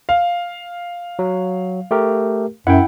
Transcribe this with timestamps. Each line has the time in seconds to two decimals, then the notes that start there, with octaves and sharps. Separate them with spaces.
0.09 F5
1.19 F#3
1.91 A3 G4 A#4
2.67 F#2 E4 F#5 G5